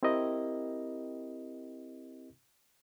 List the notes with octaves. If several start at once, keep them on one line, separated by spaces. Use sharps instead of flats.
C4 E4 G4 A#4 D#5